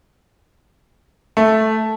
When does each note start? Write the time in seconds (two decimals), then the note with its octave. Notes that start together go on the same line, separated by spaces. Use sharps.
1.37 A3